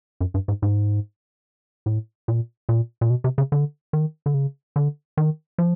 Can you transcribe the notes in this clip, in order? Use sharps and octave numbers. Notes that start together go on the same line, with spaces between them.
F#2
G2
G#2
G#2
A2
A#2
A#2
A#2
B2
C3
C#3
D3
D#3
D3
C#3
D3
D#3
F3